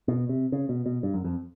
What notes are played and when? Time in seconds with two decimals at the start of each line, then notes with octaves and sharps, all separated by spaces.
0.08 B2
0.29 C3
0.52 C#3
0.69 B2
0.86 B2
1.03 G2
1.14 F#2
1.24 F2